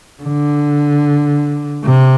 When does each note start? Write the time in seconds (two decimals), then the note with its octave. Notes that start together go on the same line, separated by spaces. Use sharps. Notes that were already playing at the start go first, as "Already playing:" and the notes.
0.23 D3
1.84 C3